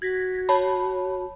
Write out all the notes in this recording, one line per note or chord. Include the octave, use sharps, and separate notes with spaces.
F#4 G#6 A#6 B6
C#5 A5 B5